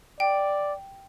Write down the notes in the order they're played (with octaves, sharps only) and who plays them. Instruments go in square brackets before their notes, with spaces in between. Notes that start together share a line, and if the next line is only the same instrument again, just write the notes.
[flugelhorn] D5 [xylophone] G5